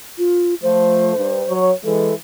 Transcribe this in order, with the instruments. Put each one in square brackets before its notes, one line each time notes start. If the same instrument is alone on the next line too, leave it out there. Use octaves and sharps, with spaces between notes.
[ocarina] F4
[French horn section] F3 A3 [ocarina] C5
[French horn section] G2
F#3 C#5
[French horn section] E3 G#3 [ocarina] A4